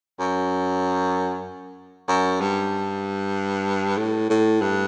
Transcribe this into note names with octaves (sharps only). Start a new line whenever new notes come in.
F#2
F#2
G2
A2
A2
G2